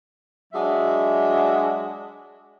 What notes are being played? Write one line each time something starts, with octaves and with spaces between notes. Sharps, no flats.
F#3 G#3 D4 F#4 E5